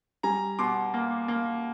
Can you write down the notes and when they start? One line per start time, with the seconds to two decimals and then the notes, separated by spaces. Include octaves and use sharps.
0.23 G3 G#5 A#5
0.59 B2 C6 D6
0.94 A#3
1.28 A#3